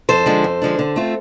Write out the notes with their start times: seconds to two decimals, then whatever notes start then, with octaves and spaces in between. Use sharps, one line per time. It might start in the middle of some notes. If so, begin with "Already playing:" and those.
0.09 F2 A4 C5
0.25 D3 F3 G#3 D4
0.44 F2
0.62 D3 F3 G#3 D4
0.79 D3
0.96 A3 C4 F4